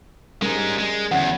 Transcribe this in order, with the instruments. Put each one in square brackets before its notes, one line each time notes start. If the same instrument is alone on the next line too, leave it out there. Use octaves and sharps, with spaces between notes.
[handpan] G3 C#4 A#4 [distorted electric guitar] G#3 D#4
[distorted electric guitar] G#3
[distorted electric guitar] E2 [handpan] D3 C#4 F#5